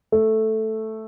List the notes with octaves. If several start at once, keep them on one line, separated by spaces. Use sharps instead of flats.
A3